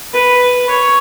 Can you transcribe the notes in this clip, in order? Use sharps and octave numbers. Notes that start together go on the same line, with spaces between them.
B4
C#5